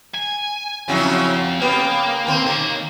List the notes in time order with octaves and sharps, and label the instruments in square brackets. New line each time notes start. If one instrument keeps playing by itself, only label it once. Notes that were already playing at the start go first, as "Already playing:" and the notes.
[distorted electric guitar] G#5
[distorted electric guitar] F2 [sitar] C#3 F#3 E4
[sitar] C#3 B3 G4 [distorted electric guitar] A#3
[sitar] D#2 C4
[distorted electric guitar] D#2 [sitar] A#3